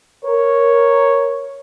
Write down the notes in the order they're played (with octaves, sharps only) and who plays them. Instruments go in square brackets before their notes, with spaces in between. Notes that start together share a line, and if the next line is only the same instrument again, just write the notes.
[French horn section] A#4 [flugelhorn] C#5